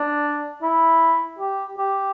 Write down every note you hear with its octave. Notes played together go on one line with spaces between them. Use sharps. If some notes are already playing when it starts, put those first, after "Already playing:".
Already playing: D4
E4
G4
G4